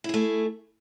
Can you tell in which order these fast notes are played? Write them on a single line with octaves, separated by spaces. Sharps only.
E4 G#4 A3